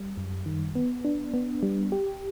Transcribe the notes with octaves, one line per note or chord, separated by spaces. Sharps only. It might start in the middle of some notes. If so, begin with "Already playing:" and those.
Already playing: G3
F#2
D#3
B3
D4
B3
G3
G4